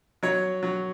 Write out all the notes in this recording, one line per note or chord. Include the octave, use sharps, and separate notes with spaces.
F#3 C#5
F#3